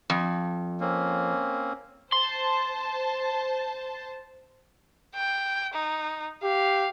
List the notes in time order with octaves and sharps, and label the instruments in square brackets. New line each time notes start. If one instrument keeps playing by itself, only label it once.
[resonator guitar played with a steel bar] F2
[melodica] A#3 C4 C#4
[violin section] C5 A5 [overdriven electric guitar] C6
[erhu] G5
D#4
[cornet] G4 [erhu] F5